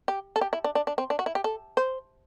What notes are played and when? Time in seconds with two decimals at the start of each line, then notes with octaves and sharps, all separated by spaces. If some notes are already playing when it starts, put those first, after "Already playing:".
0.08 G4
0.36 A4
0.41 G4
0.53 E4
0.64 D4
0.75 D4
0.87 D4
0.98 C4
1.10 D4
1.19 F#4
1.26 E4
1.35 G4
1.44 A4
1.77 C5